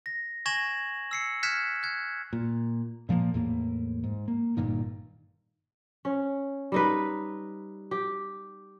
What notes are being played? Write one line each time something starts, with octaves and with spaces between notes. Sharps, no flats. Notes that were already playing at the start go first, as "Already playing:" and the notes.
A#6
G#5 C#6 G#6 A#6 E7 F#7
E6 C7 C#7
F6 F#6 G#6 B6 C#7 E7
F#6 G#6
A#2
A#2 F3 G3 A#3
E2 A2 A#3
G#2
A#3
G1 G2 A#2 D#3
C#4
G3 D#4 B4
G4